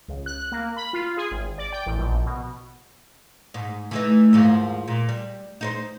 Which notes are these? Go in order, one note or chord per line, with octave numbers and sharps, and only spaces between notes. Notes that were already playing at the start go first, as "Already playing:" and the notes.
C#2
F#6
A#3
B5
F4
G#4
G#1
D5
G5
A1
A#1
B2
G#2
E3 A3 D#4
D#2 G#2 F3
A#2
G3
D#4 A#4 C5